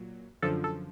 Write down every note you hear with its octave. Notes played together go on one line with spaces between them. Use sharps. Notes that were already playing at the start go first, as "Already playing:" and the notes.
Already playing: A#2 F#3
F#2 D3 F3 A4
A4